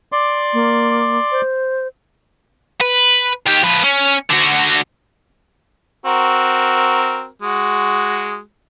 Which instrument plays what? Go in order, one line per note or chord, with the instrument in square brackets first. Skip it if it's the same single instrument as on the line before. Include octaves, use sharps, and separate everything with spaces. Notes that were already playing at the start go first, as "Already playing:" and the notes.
[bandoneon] D5 C6 D6
[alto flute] A#3
C5
[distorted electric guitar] B4
D#3 G4
F3 B4
C#4
D3 F#4
[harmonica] C4 F#4 A#4
G#3 F#4